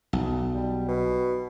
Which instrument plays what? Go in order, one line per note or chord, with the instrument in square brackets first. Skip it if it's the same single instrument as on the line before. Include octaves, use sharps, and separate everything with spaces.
[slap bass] B1
[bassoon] G3
B2